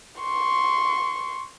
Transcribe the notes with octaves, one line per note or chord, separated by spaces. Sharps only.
C6 C#6